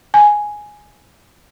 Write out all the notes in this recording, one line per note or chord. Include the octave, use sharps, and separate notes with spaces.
G#5